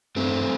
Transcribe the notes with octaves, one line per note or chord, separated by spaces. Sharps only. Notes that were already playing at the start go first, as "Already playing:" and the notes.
G2 A3 C4